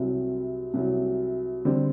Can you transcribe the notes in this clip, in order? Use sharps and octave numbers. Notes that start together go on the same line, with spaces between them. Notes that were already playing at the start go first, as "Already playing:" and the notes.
Already playing: C2 C3 F#3
C2 C3 F#3
D3 G3 C4